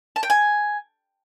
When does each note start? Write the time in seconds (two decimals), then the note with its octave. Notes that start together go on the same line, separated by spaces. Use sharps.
0.16 A5
0.23 G5
0.30 G#5